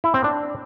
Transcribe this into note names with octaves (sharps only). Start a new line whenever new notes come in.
E4
C4
D4